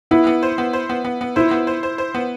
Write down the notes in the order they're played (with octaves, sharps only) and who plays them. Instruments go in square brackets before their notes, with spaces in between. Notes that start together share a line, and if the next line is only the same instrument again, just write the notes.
[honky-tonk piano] B3 [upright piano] E4
[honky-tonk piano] B3
C5
B3
C5
B3
B3
B3
[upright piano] E4 [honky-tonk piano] C5
[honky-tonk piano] B3
C5
C5
C5
B3